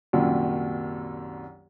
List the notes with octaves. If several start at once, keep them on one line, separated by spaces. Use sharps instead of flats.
C2 F#2 A#2 D#3